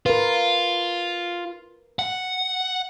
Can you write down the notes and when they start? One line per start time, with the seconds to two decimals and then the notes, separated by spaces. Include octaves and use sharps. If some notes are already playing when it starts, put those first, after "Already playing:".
0.06 F4 A#4 B4
1.99 F#5